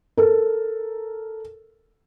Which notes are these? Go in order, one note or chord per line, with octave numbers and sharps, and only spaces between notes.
A4 A#4